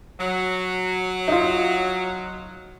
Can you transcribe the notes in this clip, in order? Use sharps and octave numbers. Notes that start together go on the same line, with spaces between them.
F#3
D#4 F4